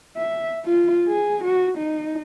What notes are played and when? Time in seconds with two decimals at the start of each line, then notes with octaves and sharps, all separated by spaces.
0.17 E5
0.65 F4
1.08 G#4
1.43 F#4
1.78 D#4